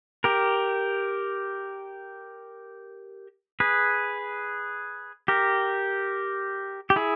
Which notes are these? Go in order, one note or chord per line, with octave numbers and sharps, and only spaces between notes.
G4 A#4
G#4 B4
G4 A#4
G4
E4 G#4